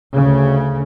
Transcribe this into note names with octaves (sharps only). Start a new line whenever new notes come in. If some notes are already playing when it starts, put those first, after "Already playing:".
D2 C#3